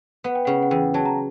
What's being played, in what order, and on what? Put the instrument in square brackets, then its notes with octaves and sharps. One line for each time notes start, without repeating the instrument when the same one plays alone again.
[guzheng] B3 [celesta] F#5
[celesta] G5
[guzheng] C#3 [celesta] F#5
[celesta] F#5
[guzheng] E2 [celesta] G5
[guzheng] F#3 [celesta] A5
[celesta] A#5